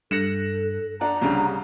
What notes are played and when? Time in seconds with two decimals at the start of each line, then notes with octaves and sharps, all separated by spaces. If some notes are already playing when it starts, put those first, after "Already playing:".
0.11 G2 A4 F#6 A#6 C#7 E7
1.01 D4 F#5 A#5
1.21 C2 C#3 G3 D4